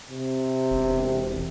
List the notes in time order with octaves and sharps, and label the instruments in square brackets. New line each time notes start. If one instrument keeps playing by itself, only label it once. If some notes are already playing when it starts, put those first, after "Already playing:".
[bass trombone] C3
[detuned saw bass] E1